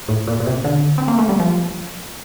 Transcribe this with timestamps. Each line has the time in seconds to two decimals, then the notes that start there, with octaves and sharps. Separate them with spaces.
0.08 A2
0.27 A#2
0.40 A#2
0.46 C3
0.64 D3
0.98 C4
1.08 A#3
1.18 A3
1.29 G3
1.40 F3